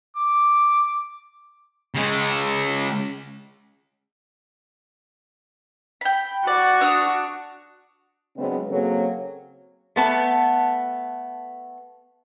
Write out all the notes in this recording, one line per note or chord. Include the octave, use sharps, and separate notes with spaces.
D6
C#3 G#3
G5 B5
F#4 D5
D4 D#6 F6
C#3 F#3 G#3 B3 C4 D4
C#3 F#3 A#3 C4 G#4 A4
A3 B3 A5